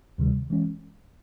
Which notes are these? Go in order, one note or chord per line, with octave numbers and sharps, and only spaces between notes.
D2 C3 D#3 G3
E3 G#3 C#4